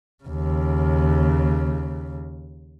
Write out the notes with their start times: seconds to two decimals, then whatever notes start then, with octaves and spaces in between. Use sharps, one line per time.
0.24 D#2 C#3